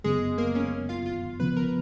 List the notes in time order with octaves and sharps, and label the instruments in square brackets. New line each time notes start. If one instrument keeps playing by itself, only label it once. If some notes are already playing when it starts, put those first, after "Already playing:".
[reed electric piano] F#2 C#3 F#3 B3 [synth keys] G#3 G#4
[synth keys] A#3 A#4
C#4 C#5
F4 F5
F4 F5
[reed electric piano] C#3 F3 B3 [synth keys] B4 B5
[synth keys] A#4 A#5